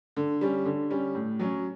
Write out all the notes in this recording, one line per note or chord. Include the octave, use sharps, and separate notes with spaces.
D3
G3 C#4
D3
G3 C#4
A2
F#3 C#4